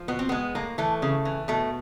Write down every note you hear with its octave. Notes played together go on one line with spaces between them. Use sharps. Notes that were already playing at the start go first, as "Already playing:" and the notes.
Already playing: F3
B2 B3
C4
G#3 B3
A2 A#3
E3 A3
C#3
E3
B2 A3